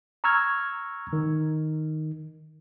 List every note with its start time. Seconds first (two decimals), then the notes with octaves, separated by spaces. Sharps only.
0.24 A#5 C#6 E6 F6 G#6
1.13 D#3